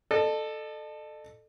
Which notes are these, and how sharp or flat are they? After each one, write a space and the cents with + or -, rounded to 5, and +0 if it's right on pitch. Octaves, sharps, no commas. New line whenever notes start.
A4 +0 D#5 -45